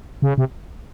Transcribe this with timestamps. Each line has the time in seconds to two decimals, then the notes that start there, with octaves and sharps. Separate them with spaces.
0.22 C#3
0.38 C3